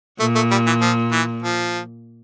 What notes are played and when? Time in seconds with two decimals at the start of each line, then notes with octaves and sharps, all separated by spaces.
0.19 A#2 A3
0.35 A3
0.51 G3
0.67 E3
0.81 F3
1.12 E3
1.42 F3